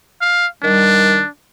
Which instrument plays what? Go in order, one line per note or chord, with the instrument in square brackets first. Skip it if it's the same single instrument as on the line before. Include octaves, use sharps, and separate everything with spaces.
[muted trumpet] F5
[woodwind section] D#3 G3 [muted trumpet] D4